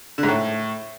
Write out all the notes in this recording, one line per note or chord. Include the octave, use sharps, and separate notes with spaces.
D3
G#2
A2